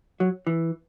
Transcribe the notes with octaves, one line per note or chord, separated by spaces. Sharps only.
F#3
E3